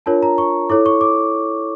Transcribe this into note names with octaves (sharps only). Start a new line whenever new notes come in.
D4 F4 A#4 C#5 A5
A#5
C#6
E4 A4 C#5 D6
C#6
D6